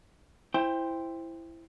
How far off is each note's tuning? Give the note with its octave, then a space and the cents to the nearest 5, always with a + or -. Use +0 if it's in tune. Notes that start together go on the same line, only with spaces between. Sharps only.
E4 +10 C5 +0 G5 +20